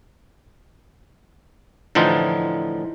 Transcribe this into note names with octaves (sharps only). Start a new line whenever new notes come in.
A2 D3 E3 F3 D#4 F4